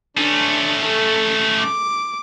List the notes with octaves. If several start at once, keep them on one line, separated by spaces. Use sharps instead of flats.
A3 C#4 D4
A4
D6